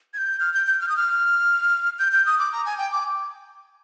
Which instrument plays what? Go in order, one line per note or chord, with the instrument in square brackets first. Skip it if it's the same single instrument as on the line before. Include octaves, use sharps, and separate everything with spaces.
[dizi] G#6
G6
F6
G6
G6
F6
D#6
F6
G6
G6
D#6
D6
A#5
G#5
G5
D6